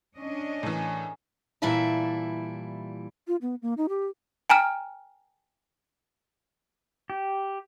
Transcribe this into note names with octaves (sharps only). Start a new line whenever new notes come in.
C#4 D4 D#5
A2 E3 G#4 A#4
A#2 E3 G3 E4 E5 A5
F4
B3
A#3
D#4
G4
G5 G#5 A#5 F6
G4